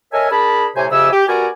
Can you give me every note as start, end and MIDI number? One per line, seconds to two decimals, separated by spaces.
0.13 0.28 69
0.13 0.28 70
0.13 0.28 73
0.13 0.28 75
0.13 0.28 76
0.13 0.28 80
0.31 0.68 62
0.31 0.68 68
0.31 0.68 70
0.31 0.68 81
0.31 0.68 83
0.76 0.86 45
0.76 0.86 48
0.76 0.86 67
0.76 0.86 72
0.76 0.86 80
0.91 1.11 41
0.91 1.11 49
0.91 1.11 67
0.91 1.11 76
0.91 1.11 80
0.91 1.11 88
1.12 1.28 67
1.28 1.48 59
1.28 1.48 66
1.28 1.48 67
1.28 1.48 70
1.28 1.48 74
1.28 1.48 80